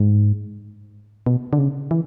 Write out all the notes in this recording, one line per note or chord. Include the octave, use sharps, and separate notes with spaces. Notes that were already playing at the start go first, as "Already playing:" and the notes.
Already playing: G#2
B2
D3
C#3
E3